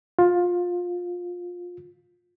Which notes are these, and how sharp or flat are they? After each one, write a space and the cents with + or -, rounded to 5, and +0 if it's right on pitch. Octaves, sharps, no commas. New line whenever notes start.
F4 +20